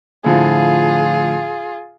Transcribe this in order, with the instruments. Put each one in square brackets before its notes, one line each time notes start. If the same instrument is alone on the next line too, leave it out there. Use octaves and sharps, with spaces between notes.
[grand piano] A2 D3 F3 [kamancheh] F4 G#4